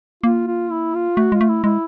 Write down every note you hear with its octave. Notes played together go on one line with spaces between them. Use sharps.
A#3 F4
F4
E4
F4
A3 F#4
G#3 F4
A3
E4
G#3 E4